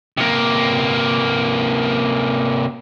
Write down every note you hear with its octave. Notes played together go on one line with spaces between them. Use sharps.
C3 A#3